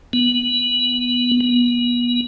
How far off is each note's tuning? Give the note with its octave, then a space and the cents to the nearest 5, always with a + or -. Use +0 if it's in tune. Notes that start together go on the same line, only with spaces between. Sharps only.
B3 -10
B3 -30